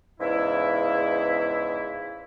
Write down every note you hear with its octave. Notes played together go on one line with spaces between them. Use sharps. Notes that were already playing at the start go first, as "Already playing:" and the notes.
E2 G#2 C#3 E4